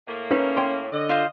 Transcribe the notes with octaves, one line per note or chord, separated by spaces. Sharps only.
A2 A#3
C#4 D#4 B4 F5
C#5 G5 C6
D3 D#5
F4 C5 F5